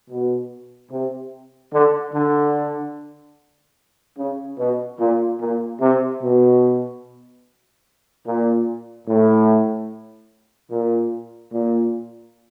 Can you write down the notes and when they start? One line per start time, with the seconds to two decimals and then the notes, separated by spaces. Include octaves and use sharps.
0.10 B2
0.92 C3
1.73 D3
2.14 D3
4.18 C#3
4.59 B2
5.00 A#2
5.40 A#2
5.81 C3
6.22 B2
8.27 A#2
9.08 A2
10.71 A#2
11.53 A#2